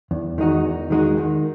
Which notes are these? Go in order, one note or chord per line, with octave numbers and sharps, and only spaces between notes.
E2
D#3 G#3 D#4 F#4
E2
D#3 G#3 D#4 F#4
D#3